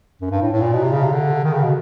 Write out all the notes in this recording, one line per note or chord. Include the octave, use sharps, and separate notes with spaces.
F#2
G2
A2
A2
A#2
B2
C3
C#3
C3
D3
D#3
C#3
B2